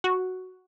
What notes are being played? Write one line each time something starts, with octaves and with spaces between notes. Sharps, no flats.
F#4